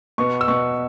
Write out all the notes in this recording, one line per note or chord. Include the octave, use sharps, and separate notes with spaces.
B2 B3 C#6
E6
B2 B3 C#6